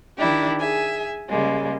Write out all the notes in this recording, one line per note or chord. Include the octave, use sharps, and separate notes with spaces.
D#3 D4 E4 G4
G#4 E5 G#5
C#3 G3 G#3 A#3